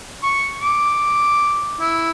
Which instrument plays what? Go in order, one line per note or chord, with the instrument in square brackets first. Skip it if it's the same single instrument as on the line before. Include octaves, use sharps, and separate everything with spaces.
[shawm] C#6
D6
E4